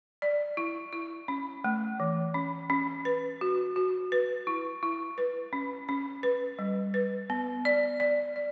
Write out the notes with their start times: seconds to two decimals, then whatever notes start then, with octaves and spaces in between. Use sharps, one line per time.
0.22 D5
0.57 E4
0.92 E4
1.28 C#4
1.64 A3
2.00 E3
2.34 C#4
2.70 C#4
3.05 B4
3.41 F#4
3.76 F#4
4.12 B4
4.47 E4
4.83 E4
5.18 B4
5.53 C#4
5.89 C#4
6.23 B4
6.59 G3
6.94 B4
7.30 B3
7.65 D5
8.00 D5
8.36 D5